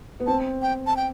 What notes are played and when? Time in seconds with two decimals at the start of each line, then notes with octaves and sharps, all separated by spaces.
0.20 B3
0.27 C4 A5
0.62 G5
0.87 A5
0.97 G5